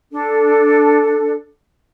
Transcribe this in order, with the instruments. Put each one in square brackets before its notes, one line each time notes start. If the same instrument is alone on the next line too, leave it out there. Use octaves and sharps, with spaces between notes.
[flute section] D4 A4